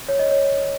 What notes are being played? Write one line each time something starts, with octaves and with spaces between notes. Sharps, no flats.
C#5
D#5
C#5